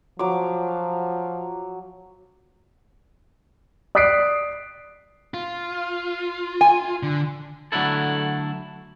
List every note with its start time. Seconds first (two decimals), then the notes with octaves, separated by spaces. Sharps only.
0.19 F3 F#3 D6
3.95 D5 D#6 F#6 B6 C7 D7
5.34 F4
6.61 G#5
7.03 D3
7.72 D3 F#3 A3 D4 E4 A4